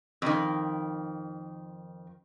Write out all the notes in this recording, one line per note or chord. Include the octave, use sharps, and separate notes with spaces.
F2 D#3